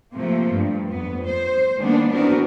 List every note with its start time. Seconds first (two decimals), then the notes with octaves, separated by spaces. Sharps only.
0.14 C3 F3 A3 A#3
0.51 G2
0.89 F2 B3
1.25 C5
1.80 D#3 G3 G#3 A#3 B3 D4
2.11 E3 B3 C4 D4 F#4 A#4